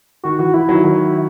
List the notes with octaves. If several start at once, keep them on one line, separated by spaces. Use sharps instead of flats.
D#3 F#4
E3 F#4
E3 E4
D#3 F#3
D#3 F#3